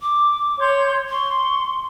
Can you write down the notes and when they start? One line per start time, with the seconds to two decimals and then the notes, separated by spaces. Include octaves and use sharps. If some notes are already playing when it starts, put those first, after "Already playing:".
0.01 D6
0.59 C#5 C6 G6
1.10 C6 C#6